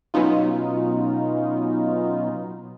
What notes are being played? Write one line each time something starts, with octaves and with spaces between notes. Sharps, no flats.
B2 F#3 B3 C#4 D#4 F4